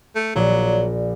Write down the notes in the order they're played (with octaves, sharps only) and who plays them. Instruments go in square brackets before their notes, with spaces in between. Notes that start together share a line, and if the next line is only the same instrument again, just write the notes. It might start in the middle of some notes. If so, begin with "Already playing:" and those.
[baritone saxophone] A3
[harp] A#1 F3 D5 [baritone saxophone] F#3